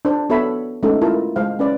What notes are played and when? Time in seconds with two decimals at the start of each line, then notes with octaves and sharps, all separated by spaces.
0.05 D4 C5
0.30 B3 F#4 A4 C#5 E5 B5
0.83 G#3 A3 C#4 D#4 F#4 A4
1.01 A3 E4 F4 A#4 A5
1.36 G#3 C5 F5
1.59 C#4 B4 D5